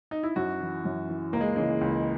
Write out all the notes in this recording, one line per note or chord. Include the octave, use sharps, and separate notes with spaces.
D#4
E4
F#2 F#4
E3
F#2
E3
C#2 A#3
G#3
C#3 E3 G#3
C#2